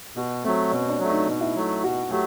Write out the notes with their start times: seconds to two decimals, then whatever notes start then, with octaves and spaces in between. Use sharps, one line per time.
0.16 B2 F#4
0.44 F#3 A3 C4
0.72 B2 C#4
0.90 D4
1.00 F#3 A3
1.09 D#4
1.27 B2 D#4
1.41 E4
1.55 F#3 A3
1.83 B2 F#4
2.10 F#3 A3 G4